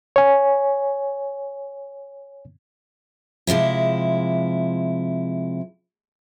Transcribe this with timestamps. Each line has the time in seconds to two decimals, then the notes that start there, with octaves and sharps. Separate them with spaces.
0.16 C#5 G#5
3.47 C3 F3 G#3 E4